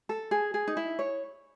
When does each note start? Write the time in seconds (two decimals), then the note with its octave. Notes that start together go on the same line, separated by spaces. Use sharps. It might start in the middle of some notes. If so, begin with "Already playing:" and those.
0.09 A4
0.31 G#4
0.54 G#4
0.68 D#4
0.77 E4
0.99 C#5